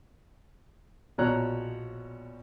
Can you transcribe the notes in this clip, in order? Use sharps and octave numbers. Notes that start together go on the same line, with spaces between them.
A#1 B2 F3 C#5 A#5 F#6